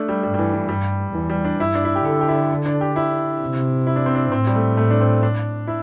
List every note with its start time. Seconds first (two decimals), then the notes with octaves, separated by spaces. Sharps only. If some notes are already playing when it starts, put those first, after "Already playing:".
Already playing: A3 D4
0.09 G3
0.23 G2 G3
0.34 G3
0.39 E3
0.53 E3
0.69 G2 G3
1.14 E2 E3
1.30 G3
1.45 D4
1.60 G2 E4
1.75 D4
1.85 E4
1.95 G4
2.05 D3 A4
2.21 G4
2.28 E4
2.66 D4
2.81 G4
2.96 E4
3.41 C3
3.87 E4
3.96 D4
4.06 C4
4.15 D4
4.32 A2 C4
4.47 G3
4.55 A3
4.77 A3
4.91 D4
5.00 C4
5.23 D4
5.67 E4